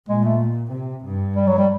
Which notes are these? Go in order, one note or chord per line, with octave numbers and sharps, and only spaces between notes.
A#2 G#3
A3
C3
G2
G3
F#3
G3